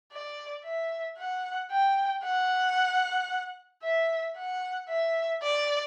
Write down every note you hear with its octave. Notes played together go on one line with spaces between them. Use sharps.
D5
E5
F#5
G5
F#5
E5
F#5
E5
D5